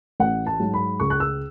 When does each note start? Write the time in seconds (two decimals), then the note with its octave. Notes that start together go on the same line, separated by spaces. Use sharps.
0.20 A1 F#5
0.47 A5
0.60 G#2 F#3
0.74 B5
1.00 C#2 C#6
1.10 F#6
1.20 E6